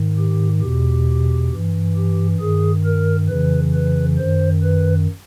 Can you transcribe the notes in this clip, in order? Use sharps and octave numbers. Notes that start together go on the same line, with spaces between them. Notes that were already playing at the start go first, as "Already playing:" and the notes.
Already playing: G#2 D#3
G4
E2 B2 G4
G2 E3
G4
G2 D#3 G#4
A#4
F2 C#3 E3 B4
B4
F#2 D#3 C5
B4